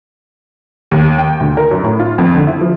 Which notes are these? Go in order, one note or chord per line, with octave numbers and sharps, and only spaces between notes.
D#2
G5
D2
A#4
F#2
A2
F4
F2
D3
E4
F3